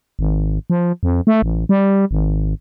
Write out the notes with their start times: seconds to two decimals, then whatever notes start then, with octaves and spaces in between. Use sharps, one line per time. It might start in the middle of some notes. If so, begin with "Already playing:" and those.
0.19 G#1
0.70 F3
1.03 F2
1.27 A3
1.42 A1
1.69 G3
2.11 G#1